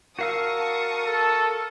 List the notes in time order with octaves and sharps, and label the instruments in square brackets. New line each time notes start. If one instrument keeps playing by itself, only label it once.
[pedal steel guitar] F#4 F5 E6 [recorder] A#4 [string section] A5 C#6 D#6
[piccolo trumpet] A4